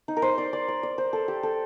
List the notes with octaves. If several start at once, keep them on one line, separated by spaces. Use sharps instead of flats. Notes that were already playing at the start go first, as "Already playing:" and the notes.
D#4
A#4
C5
D5
D5
D5
D5
C5
A4
G4
A4